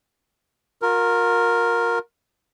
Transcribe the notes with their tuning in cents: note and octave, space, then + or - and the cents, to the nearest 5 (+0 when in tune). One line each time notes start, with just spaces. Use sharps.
F4 +45 A#4 +0